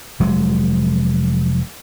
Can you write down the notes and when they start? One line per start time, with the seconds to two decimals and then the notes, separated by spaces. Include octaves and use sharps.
0.20 F1 F#3 G#3